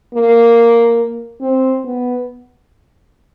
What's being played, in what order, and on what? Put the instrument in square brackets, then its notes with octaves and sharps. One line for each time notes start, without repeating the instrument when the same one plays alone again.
[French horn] A#3
C4
B3